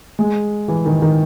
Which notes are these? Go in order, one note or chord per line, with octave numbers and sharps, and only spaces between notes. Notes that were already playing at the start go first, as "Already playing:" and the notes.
G#3
E3
D#3
D#3